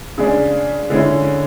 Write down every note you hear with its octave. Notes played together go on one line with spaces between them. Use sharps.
C#3 G#3 D4
D3 G#3 C#4 E4